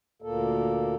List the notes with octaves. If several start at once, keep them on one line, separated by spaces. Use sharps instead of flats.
D2 A#2 A#3 A4